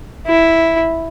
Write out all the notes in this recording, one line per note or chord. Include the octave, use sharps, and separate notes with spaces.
E4